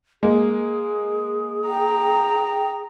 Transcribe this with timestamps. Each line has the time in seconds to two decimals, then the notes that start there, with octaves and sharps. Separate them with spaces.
0.23 G#3 A#3 G#4
1.68 G5 A#5